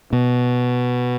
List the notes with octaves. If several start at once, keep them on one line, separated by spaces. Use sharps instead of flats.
B2